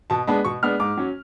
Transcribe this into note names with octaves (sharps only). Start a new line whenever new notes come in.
B2 A5
G#3 B3 D4 A5
B2 C#6
G#3 B3 D4 F6
G#2 D6
F#3 C#4